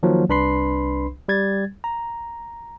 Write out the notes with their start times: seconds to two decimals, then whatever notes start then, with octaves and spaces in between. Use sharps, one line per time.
0.03 D#3 F3 F#3 A#3
0.29 C2 D4 B4 B5 C6 C7
1.28 G3 G#6 A6
1.84 A#5